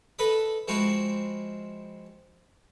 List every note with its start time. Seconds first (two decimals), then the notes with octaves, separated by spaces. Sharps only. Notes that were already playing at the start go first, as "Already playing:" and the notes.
0.19 A4 B4 D#5 B5
0.68 F3 G#3 C4 E4 F#4